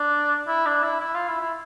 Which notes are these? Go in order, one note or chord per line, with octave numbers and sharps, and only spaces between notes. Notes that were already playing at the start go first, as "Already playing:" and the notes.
Already playing: D4
E4
D4
E4
E4
F4
E4
E4